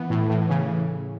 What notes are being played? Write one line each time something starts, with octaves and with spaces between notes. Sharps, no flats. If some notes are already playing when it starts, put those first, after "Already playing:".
Already playing: E3 B3
A2
A2
C#3